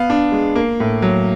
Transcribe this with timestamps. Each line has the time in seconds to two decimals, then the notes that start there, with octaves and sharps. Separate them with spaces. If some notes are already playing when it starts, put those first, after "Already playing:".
Already playing: B3 F5
0.10 D4
0.32 G#3
0.55 A#3
0.80 A2
1.02 F#3